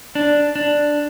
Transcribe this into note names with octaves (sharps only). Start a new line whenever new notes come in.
D4
D4